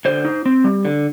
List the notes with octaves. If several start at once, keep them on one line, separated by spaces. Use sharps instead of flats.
D3 C5
D#4
C4
G3
D3